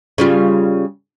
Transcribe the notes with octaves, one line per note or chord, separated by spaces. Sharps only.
C#3 G3 F4